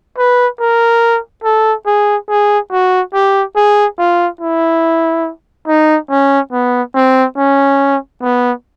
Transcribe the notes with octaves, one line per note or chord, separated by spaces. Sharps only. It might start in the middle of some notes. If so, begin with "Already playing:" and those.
B4
A#4
A4
G#4
G#4
F#4
G4
G#4
F4
E4
D#4
C#4
B3
C4
C#4
B3